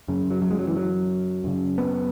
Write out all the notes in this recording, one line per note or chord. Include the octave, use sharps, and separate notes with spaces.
F#2 C#3
F#3
F#3
G#3
F#3
E3
F#3
F#2 C#3
B3